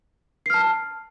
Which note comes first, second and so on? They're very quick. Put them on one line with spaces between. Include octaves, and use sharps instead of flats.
C7 F6 A5